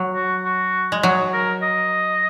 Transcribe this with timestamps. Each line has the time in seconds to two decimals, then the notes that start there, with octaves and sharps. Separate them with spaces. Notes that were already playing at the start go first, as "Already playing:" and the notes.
Already playing: F#3
0.15 F#4
0.45 F#4
0.92 G#3
1.03 F#3 G#4
1.33 A#4
1.63 D#5